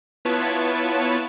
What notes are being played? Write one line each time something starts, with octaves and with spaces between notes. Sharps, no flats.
B3 E4 F4 B4 C#5 A5